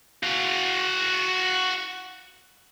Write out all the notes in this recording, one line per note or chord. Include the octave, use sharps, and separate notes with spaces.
F#4 F5